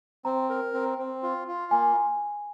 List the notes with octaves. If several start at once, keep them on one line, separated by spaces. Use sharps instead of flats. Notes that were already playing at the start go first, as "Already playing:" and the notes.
C4 A#5
A#4
C4
C4
F4
F4
A#3 G#5